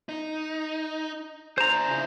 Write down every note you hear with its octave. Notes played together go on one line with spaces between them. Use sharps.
D#4
D4 G#4 C5 A#5
C#3 E4